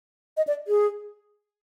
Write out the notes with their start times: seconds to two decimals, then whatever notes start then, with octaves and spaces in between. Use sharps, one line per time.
0.37 D#5
0.47 D5
0.68 G#4